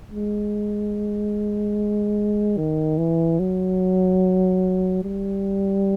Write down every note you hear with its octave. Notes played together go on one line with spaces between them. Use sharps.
G#3
D#3
E3
F#3
G3